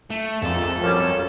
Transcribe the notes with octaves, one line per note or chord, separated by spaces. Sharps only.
A3
A#1 F2 G#2 A4
F#2 G3 C#4